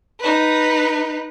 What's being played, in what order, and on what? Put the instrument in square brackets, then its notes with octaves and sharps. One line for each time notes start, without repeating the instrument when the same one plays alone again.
[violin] D#4 B4